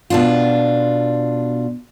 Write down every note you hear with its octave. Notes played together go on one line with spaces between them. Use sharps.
B2 D4 F4